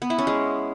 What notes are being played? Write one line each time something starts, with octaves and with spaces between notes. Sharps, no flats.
B3
E4
C#4
G#3